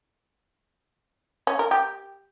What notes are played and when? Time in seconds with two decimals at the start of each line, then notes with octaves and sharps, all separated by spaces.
1.47 C#4
1.59 A#4
1.71 G4